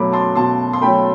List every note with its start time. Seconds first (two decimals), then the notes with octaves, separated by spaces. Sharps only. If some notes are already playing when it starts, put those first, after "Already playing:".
Already playing: B2 F#3 A3 B5 D6
0.12 A5 C6
0.36 B2 A5 C6
0.73 C6
0.82 F#3 A3 G5 B5